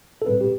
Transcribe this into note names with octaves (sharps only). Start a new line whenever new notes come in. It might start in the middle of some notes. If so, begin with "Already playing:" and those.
A4
A2 G3 C4 B4
G4